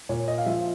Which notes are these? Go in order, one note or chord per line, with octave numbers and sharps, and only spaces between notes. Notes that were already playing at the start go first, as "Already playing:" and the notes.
A#2 C#5
D#5
F5
F3 E5